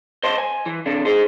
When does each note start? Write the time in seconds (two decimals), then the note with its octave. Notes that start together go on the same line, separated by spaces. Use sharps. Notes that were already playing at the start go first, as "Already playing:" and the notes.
0.23 C5 D#5 G5 A5 C6
0.38 G#5
0.66 E3
0.86 C3 D4 A4
1.05 D#4 G#4 C5